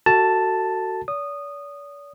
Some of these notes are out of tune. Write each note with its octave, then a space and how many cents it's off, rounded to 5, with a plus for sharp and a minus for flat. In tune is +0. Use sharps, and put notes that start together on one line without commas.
F#4 +15 A4 +35 A5 +0
D5 -45 D#6 -15